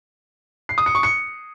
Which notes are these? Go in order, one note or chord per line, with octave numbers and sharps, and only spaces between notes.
C7
D#6
C#7
C#6
C#7